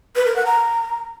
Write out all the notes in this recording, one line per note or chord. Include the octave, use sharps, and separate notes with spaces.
B4
A#4
F#5
A#5